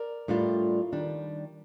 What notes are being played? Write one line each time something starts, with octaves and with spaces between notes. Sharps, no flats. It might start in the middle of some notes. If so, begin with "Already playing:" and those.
Already playing: A#4 D5
A2 G3 D4 F4
D#3 G3 D4